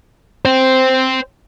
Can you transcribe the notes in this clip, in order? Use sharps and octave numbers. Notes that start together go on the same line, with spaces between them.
C5 G5